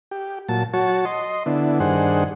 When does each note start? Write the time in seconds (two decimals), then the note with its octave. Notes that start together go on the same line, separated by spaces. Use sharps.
0.11 G4
0.49 A#2 F#3 A5
0.73 F#3 F#4 C#5 A5
1.05 D#5 C6
1.46 D3 B3 D4 E4
1.80 G2 D#3 D4 G#4 C5 F#5